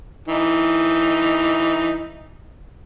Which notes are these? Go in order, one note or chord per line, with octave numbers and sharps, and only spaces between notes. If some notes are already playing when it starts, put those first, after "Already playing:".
E3 D#4